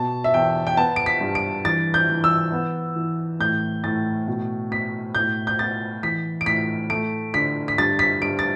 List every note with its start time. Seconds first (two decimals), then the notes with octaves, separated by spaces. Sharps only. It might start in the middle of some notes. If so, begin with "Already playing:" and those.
Already playing: B2 A5
0.24 E5
0.34 E2 G5
0.67 G5
0.77 B3 A5
0.96 D7
1.06 B6
1.21 G2
1.35 D7
1.65 E3 A6
1.94 G6
2.09 E3
2.24 E6
2.52 B3
2.96 E3
3.40 A2 G6
3.84 A2 A6
4.27 B2
4.71 B2 B6
5.15 A2 G6
5.47 G6
5.59 B3 A6
6.03 E3 B6
6.41 D7
6.46 A2 B6
6.90 A3 D7
7.34 D3 B6
7.68 B6
7.78 G2 A6
7.99 B6
8.22 G2 D7
8.39 A6